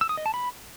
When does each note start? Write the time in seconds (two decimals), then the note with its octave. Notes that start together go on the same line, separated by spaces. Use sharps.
0.01 E6
0.09 D#6
0.17 D#5
0.26 A5
0.34 B5